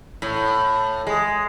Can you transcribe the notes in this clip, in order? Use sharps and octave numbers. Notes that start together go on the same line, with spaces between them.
A2
G#3